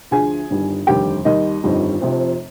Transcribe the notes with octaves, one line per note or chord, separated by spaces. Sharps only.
D2 D3 F3 G#4 G#5
G1 G2 D#3 G3
F1 D#2 D3 G3 G4 G5
D#2 D#3 G3 D#4 D#5
G1 F2 D#3 G3
F1 F2 C3 F3